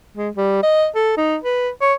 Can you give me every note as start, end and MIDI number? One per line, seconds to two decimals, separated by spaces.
0.16 0.29 56
0.37 0.62 55
0.63 0.87 75
0.95 1.16 69
1.17 1.36 63
1.44 1.69 71
1.81 1.93 73